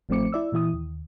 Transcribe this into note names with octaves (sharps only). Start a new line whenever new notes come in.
A1 F3 A3 C4 D6 C#7
E4 D5 E6
A#2 E3 E4 D#6
D#2